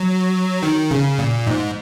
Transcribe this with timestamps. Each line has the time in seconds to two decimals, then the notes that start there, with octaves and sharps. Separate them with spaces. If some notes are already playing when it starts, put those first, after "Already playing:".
Already playing: F#3
0.63 D#3
0.91 C#3
1.19 A#2
1.47 G#2